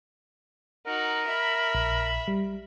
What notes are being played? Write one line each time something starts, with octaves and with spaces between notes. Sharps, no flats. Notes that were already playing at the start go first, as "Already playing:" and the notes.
D#4 F#4 A#4
E5 B5
A#1
G3